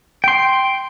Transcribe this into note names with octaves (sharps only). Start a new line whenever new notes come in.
G5 C6